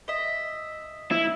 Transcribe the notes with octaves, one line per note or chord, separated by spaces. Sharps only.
D#5 E5
E4